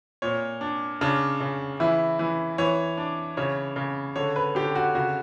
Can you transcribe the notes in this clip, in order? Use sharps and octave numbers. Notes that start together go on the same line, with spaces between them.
A#2 C#5
D4
C#3 D4
C#3
E3 E4
E3
E3 C#5
D4
C#3 C#5
C#3
D3 C#5
B4
D3 G4
F#4
C#3 F#4